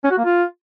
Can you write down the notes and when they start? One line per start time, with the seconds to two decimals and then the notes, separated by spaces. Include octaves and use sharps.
0.04 C#4
0.11 F#4
0.18 A#3
0.25 F4